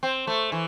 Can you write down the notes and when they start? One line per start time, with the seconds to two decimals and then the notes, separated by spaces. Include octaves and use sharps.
0.03 C4
0.27 A3
0.52 E3